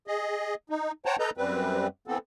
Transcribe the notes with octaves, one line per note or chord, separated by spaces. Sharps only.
G#4 D#5
D#4
C5 C#5 F#5 G5 A5 A#5
A4 B4 D#5 A#5 G6
F#2 G3 C4 B4
E3 B3 C4 A4